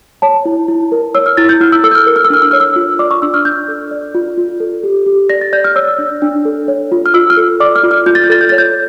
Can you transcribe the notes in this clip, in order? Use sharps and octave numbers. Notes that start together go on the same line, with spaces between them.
C#5 A5
E4
E4
A#4
C#5 E6
F6
E4 A6
G6
E4 F6
E6
A4 E6
G6
F6
A#4 E6
F6
E6
D4 F6
E6
C#5 F6
E6
F4
D5 D6
C#6
D4 E6
F6
D4 G6
A4
D5
F4
F4
A4
G4
G4
D5 A#6
A6
D5 G6
F6
C#5 E6
D4
D4
A4
C#5
F4
F6
F4 E6
F6
A4
D5 D6
F6
F4
F6
F4 G6
A6
G6
A4 A6
G6
C#5 A6
G6